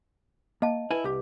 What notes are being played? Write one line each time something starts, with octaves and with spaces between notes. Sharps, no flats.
A#3 D#5 A5
E4 B4 G#5
C2 G4